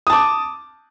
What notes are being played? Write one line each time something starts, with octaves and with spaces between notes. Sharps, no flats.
A5 D6 D#6